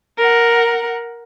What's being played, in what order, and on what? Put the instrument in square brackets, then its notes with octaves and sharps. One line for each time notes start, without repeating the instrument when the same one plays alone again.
[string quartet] A#4 F#5